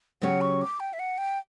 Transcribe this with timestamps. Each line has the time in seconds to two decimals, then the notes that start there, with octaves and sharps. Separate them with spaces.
0.22 C#3 F#3 C#4 G4 C#5 F#5
0.41 C#6
0.61 D6
0.80 G5
0.93 E5
0.99 F#5
1.18 G5